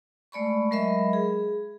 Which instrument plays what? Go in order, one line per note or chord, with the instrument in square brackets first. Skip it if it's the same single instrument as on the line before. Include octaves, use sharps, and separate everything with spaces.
[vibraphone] G#3 A3 D5 B5 C#6
F#3 G#3 A#4 D#5 E5 B5
G#4